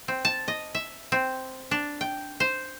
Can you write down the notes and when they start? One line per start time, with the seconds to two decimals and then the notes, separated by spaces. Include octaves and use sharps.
0.08 C4
0.25 A5
0.48 D#5
0.75 E5
1.12 C4
1.71 D4
2.01 G5
2.40 C5